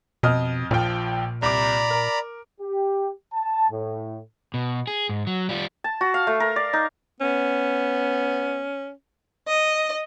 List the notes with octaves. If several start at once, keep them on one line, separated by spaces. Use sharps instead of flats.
F2 B2 D#5 F6
A#1 A#2 F3 G5
C2 D5 A#5 B5 D6
A#4
G4
A5
A2
B2
G#4
G#2
F#3
G3 F4
A5
F#4
F5
A3
A#4
D5
D#4
B3 C#4
D#5